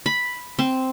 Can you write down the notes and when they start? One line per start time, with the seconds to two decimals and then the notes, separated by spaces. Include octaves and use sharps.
0.06 B5
0.59 C4